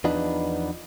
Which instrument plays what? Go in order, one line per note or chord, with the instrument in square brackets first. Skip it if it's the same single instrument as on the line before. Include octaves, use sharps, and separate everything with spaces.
[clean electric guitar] E2 F3 B3 D4 D#4 B4